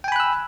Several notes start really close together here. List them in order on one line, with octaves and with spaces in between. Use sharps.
G5 G#5 B5 F#6 E6